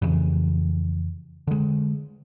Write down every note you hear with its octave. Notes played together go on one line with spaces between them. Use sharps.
F2 C#3 E3
D3 G#3